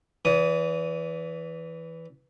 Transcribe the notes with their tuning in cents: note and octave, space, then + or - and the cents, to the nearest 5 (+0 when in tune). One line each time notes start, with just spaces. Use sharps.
E3 +0 D5 -45 D#6 +0